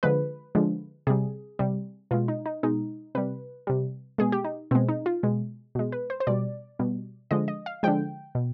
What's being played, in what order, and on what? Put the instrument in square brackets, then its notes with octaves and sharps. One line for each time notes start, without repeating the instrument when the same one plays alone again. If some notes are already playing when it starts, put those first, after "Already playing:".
[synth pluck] D3 F3 G#3 B4
D3 F3 G#3
C3 G3 G#4
C3 G3
B2 G#3 F4
D#4
D#4
B2 G#3 D#4
C3 G3 B4
C3 G3
B2 G#3 G#4
G4
D#4
B2 G#3 C4
D#4
F4
B2 G#3
B2 G#3
B4
C5
C5
B2 G3 D5
B2 G3
D3 F3 G#3 D#5
D#5
F5
D3 F3 G#3 G5
B2